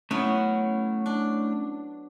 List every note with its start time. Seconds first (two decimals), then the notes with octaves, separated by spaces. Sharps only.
0.11 F#3 A3 B3 C#4 E4
1.06 D4